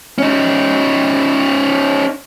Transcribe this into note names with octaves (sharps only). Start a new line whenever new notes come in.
C#4 D#4